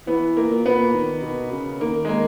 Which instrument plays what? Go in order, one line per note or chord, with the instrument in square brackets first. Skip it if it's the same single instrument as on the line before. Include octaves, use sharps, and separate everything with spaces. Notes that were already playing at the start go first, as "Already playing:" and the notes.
[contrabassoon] E3 [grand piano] B3
[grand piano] A#3
[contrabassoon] A#2
[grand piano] B3
[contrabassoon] D#3
B2
C#3
[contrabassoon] D#3 [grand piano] A#3
[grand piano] G#3
A#3